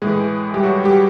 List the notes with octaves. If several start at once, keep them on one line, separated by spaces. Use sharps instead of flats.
A2 E3 G#3 G#4
G3 G4
F#3 F#4
G3 G4